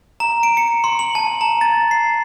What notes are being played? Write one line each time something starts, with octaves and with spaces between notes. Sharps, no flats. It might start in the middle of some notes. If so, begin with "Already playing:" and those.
A#5
D7
C#7
C6
F#7
A5
A#5
A6
C7